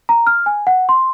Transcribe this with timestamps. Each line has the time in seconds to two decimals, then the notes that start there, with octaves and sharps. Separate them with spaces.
0.09 A#5
0.27 F6
0.46 G#5
0.67 F#5
0.89 C6